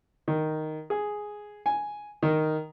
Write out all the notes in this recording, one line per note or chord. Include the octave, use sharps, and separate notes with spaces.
D#3
G#4
G#5
D#3